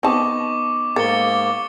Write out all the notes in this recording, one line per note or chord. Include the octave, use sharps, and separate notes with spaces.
B3 C4 D#4 A5 C#6 D6
G#2 A#3 A#4 A6 C#7 G7